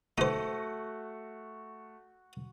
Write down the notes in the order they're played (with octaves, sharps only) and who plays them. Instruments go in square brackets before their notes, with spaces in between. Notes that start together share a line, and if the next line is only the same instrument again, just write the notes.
[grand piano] A3 [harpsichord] D#4 C5 [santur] F#4